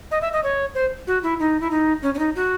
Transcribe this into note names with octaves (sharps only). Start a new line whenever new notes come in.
D#5
E5
D#5
C#5
C5
F#4
E4
D#4
E4
D#4
C#4
C#4
D#4
F#4